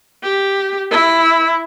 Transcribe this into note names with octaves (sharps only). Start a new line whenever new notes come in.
G4
E4